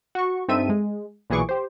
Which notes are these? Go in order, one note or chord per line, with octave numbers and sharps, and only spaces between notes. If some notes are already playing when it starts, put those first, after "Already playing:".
F#4 C#6
G2 C4 D#4 A4 E5 D#7
G#3
B1 A#2 E3 G#4 C#6 D6
G4 C5